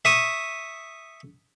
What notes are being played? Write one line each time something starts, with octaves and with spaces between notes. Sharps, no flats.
E5 C#6 D#6